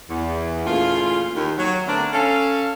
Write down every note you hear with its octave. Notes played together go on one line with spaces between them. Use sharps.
E2
A#2 C#3 E3 A3 F4
D#2
F#3
D3 A3 B3 C4 D4 A#4
C#4 A4 F5